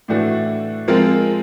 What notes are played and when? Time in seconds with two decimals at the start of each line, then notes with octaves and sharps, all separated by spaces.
0.08 A2 E3 A3 D4 F#4
0.88 F3 G#3 C4 F4 A#4